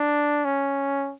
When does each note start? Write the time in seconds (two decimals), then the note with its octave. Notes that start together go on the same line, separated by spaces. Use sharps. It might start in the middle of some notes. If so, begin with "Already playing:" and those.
Already playing: D4
0.45 C#4